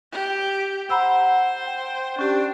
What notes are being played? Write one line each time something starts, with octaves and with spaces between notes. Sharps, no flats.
G4
C5 F#5 A#5 B5 E6
G5
C#4 D4 G4